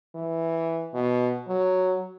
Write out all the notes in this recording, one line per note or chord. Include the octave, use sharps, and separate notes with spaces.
E3
B2
F#3